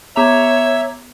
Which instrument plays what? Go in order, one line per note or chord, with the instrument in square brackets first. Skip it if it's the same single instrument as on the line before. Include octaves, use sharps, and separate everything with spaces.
[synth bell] B3 F7 [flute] C#5 [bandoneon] E5 E6 [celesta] A#5 D6